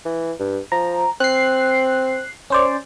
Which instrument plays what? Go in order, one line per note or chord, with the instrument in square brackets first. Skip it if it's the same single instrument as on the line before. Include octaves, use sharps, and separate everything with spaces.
[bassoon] E3
G2
[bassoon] F3 [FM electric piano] A#5
[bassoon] C4 [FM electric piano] F#6 C7
[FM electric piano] C#4 C5 D5